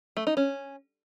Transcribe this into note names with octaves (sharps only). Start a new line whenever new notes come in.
A3
D#4
C#4